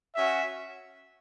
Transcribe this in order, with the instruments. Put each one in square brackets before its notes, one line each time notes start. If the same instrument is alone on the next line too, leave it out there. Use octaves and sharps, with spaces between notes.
[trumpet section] C#4 F#4 E5